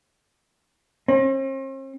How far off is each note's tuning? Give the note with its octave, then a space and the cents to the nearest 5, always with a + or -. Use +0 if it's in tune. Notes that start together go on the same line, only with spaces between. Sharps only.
C4 +45